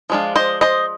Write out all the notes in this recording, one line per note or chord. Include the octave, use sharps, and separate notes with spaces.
F3 G#3 D4 F4
C5 D#5
C5 D#5